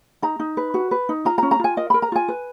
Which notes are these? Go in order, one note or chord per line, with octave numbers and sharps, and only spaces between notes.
D#4 A#5
D#4
B4
F#4
B4
D#4
F4 A#5
A#5
C#4
A#5
F4 G#5
A#4 D#5
A#4 B5
A#5
F4 G#5
B4